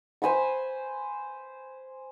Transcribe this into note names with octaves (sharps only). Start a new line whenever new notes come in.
C5 G#5 B5 C#6